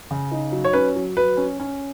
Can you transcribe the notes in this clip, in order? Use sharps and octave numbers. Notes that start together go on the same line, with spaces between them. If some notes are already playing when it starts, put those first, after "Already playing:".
C#3
D#4
F#3
C#5
C#4 B4
F#3
F#3 B4
C#4
C#4